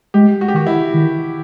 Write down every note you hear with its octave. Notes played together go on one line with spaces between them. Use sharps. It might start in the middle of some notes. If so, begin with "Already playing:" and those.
G#3 G4
F#4
G4
D#3 F#4
E4
D#3